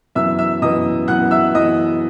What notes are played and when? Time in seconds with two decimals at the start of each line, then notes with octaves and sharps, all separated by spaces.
0.15 F#2 E3 B3 E5 E6
0.39 E5 E6
0.62 F#2 E3 B3 D#5 D#6
1.08 F#2 E3 B3 F#5 F#6
1.31 E5 E6
1.54 F#2 E3 B3 D#5 D#6